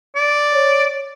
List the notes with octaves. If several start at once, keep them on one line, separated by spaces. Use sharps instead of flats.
D5
C#5